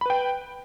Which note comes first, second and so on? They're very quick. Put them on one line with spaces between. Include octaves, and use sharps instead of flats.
B5 B4 G5